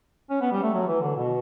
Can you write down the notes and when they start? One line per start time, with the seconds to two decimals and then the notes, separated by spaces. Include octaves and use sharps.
0.30 C#4
0.41 B3
0.52 G3
0.63 A3
0.73 F#3
0.87 E3
1.01 D3
1.16 B2